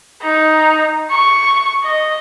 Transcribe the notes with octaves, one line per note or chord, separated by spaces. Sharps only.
D#4
C#6
D#5